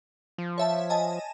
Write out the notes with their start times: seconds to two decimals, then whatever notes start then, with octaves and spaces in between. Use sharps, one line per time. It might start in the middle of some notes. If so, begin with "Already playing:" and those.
0.38 F3
0.58 C#5 E5 A5
0.90 D#5 G#5 A5